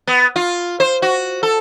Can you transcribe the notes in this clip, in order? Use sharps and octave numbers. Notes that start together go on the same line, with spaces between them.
B3
F4
C5
F#4
A4